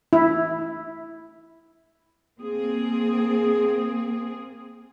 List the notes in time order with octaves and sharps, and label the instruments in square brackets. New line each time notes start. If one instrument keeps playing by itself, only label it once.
[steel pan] E4
[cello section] A#3 C4 G#4